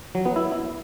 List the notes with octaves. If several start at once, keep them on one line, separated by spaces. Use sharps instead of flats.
F#3
B3
E4